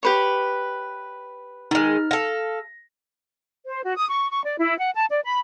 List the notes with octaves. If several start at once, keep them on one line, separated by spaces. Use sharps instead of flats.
G4 B4 C#5
D#3 G#3 D#4 F6
A4 F5 A#6
C5
F#4
D#6
C#6
C#6
D5
E4
F#5
A5
D5
B5